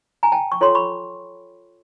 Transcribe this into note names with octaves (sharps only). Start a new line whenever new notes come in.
G#5 A#5
G5 A5
C#6
F4 A4 C#5 C6
B5 C#6